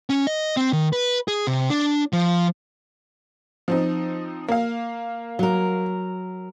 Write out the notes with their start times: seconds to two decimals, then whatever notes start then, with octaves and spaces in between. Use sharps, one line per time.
0.10 C#4
0.27 D#5
0.57 C4
0.73 D#3
0.93 B4
1.28 G#4
1.47 C3
1.70 D4
2.13 F3
3.68 F3 C4 D#4
4.48 A#3 F5
5.39 F#3 A#4